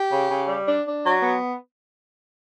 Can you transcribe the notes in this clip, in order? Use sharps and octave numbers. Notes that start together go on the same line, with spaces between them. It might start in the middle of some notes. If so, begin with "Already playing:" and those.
Already playing: G4
C#3
C#3
G3
D4
D4
F#3
B3